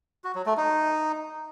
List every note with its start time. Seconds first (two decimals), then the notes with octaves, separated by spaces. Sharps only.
0.24 F#4
0.35 F#3
0.46 A3
0.57 D#4